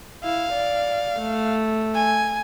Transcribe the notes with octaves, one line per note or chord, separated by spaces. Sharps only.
E4 F5
D5
A3
G#5